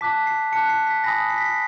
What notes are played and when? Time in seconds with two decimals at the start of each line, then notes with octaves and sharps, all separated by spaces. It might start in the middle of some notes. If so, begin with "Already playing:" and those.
0.01 A5 D6 F#6 B6
0.27 C7
0.52 A5 D6 F#6 C#7
0.69 C7
0.87 B6
1.04 G#5 B5 D#6 A#6
1.30 C7
1.38 B6
1.45 C7